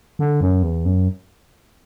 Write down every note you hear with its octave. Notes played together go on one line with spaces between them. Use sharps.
D3
F#2
E2
F#2